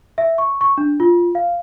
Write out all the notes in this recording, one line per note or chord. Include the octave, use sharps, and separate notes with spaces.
E5
C#6
C#6
D4
F4
F5